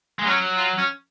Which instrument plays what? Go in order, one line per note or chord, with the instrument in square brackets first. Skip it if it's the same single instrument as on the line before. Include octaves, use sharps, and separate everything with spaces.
[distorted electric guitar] G#3
[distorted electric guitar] F#3 [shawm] C#4
[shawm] F4
C#4